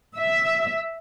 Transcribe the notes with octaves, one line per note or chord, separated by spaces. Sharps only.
E5